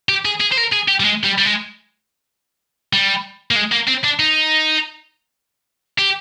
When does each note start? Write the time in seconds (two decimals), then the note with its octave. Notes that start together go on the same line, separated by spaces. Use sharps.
0.09 G4
0.25 G#4
0.40 G#4
0.52 C5
0.57 A#4
0.72 G#4
0.88 G4
1.00 G3
1.04 G#3
1.25 G3
1.38 G3
1.46 G#3
2.93 G3
3.51 A#3
3.56 G#3
3.72 A#3
3.88 C4
4.04 D4
4.19 D#4
5.99 G4